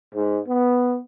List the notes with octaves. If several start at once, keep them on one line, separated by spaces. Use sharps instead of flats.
G#2
B3